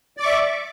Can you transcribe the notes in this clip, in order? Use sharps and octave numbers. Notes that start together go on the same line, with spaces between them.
D5 E5 C#6 D6